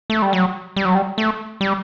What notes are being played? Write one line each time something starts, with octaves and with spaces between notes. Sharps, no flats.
A3
G3
F#3
G3
F#3
G3
A3
G3